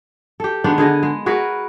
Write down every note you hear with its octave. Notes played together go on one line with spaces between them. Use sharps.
G4 A4
D#3 G#3 B3 D4
D3 G#4 D#5
G#3
F#4 G#4 A#4 B4